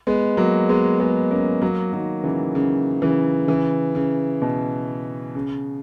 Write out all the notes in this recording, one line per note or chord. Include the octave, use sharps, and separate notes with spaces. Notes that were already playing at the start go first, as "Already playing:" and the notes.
G#3 B3
F#3 A#3
G#3 B3
G#3 B3
A#3 C#4
F#3 A#3
D#3 F#3
C#3 E3
C#3
C#3 E3
C#3 E3
C#3
B2
C#3